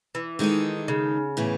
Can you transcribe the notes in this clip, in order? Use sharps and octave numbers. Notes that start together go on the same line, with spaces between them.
E3
D#3 G#3 D#4 A4
C#3
A2 E3 B3